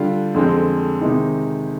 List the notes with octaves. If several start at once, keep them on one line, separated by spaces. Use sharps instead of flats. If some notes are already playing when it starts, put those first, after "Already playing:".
Already playing: D3 G3 D4 F4
F2 D3 G#3 C4
C3 D#3 G#3 D#4